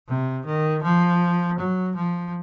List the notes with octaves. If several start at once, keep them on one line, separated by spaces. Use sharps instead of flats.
C3
D#3
F3
F#3
F3